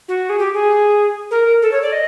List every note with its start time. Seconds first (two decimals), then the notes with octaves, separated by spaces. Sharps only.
0.08 F#4
0.30 G#4
0.39 G4
0.54 G#4
1.31 A#4
1.62 A4
1.72 C#5
1.82 D5
1.92 D#5